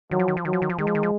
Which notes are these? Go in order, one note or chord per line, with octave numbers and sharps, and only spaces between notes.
D#3 F#3
F3
D#3
F3
D#3 F#3
F3
D#3
F3
D#3 G#3
F3
D#3
F3